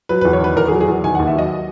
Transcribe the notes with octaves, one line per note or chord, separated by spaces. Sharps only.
F#3 B4
B4
E2
C#5
D#3 B4
E2 A#4
G#4
F#3
G#4
E2
D#3 G#5
F#5
D#2
E5
F#3 D#5